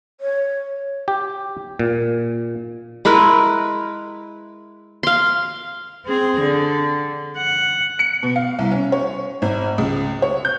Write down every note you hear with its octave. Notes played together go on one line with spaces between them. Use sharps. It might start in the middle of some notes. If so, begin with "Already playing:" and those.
C#5
G4
A#2
G#3 E4 A#4 B4
F5 C6
C4 G#4
D3
F#5
C#7
B2
F5
C2
C#4
C#5
G#1
C#2
C#5
G6